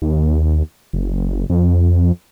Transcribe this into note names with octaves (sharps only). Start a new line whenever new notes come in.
D#2
F#1
F2